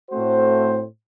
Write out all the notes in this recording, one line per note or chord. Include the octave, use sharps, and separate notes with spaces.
A2 A3 C4 F#4 C5